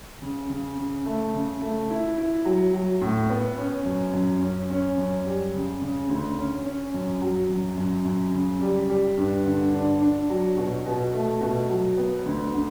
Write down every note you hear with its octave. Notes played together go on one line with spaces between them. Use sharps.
C#3
C#3
C#3
A3
C#3
A3
E4
E4
F#3
F#3
A2
B3
C#4
F#2
F#2
C#4
C#4
F#2
G3
C#3
C#3
D2
C#4
C#4
F#2
F#3
F#2
F#2
F#2
C#3
G3
G3
G2
D3
D4
D4
F#3
B2
B2
A3
B2
F#3
B3
D2
D3